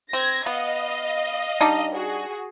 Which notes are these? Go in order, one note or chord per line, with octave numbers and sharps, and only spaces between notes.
C4 G#6 A#6
B3 D#5 F5
G3 D4 D#4
F#4 G#4